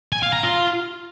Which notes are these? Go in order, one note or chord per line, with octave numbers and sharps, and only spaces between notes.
G#5
F5
A#5
F4